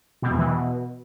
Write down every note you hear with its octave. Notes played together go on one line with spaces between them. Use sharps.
B2
E2
E3
B2